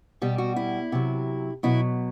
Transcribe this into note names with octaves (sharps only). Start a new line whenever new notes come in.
B2 G3 G4
F#4
E4
C3 F#3
B2 F#3 E4